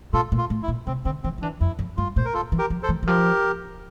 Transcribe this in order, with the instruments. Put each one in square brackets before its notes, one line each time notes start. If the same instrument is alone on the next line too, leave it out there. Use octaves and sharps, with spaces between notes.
[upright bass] A#2 [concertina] F4 A4
[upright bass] A#2
[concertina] F4
[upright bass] A2
[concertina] E4
[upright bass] A#2
[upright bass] C3 [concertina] C4
[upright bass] D3 [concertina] C4
[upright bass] E3 [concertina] C4
[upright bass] F3
[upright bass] E3 [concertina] D4
[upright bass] F2 [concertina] E4
[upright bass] F2
[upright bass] G2 [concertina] F4
[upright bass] A#2 [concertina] C5
[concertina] A#4
F4 A4
[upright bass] E3
[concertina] G4 A#4
[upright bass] F3
[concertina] A4 C5
[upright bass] E3
E3
[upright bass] F3 [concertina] G4 A#4